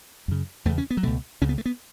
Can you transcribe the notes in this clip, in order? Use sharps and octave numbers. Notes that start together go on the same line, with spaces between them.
F#2 C#3
E2 C#3 A3
C#4
B3
F#3
C#2 B2 A3
C#2 C#3 C#4
B3
A3
B3